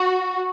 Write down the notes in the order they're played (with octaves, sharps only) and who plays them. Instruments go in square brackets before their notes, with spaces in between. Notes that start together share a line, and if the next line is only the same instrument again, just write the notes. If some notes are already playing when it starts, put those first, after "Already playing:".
Already playing: [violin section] F#4